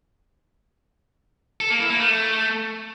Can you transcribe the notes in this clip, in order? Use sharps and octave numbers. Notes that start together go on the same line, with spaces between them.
A4
A#3
E4
A#3
A3